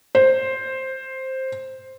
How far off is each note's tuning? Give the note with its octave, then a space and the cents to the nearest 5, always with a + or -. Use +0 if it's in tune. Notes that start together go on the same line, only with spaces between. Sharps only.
C5 +5